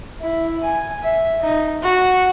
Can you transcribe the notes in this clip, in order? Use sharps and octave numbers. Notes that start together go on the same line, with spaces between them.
E4
G#5
E5
D#4
F#4